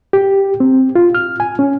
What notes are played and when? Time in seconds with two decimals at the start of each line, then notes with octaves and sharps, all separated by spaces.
0.13 G4
0.60 C4
0.96 F4
1.15 F6
1.40 G#5
1.59 C#4